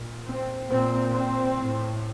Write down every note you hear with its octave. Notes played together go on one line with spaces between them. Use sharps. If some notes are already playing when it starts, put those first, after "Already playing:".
Already playing: A#2
C4
A#2 C4
C4
A2